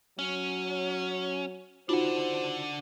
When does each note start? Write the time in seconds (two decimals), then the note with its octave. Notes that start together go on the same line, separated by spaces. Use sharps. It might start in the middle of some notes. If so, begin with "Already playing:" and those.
0.19 F#3 C#4
1.89 D4 D#4 F4 F#4 C5 F#5